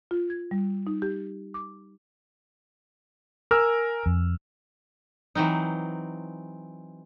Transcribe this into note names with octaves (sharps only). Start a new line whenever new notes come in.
F4
G#6
G3
D#4
G4
D6
A#4 G#5 E6 F6
F2
E3 F#3 C4 D#4